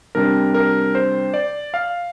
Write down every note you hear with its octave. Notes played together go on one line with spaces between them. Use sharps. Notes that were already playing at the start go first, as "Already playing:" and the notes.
C3 G3 D4 A#4
A#4
C5
D5
F5